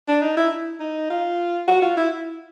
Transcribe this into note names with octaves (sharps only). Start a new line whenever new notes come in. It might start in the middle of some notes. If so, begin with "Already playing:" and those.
D4
D#4
E4
D#4
F4
F#4
F4
E4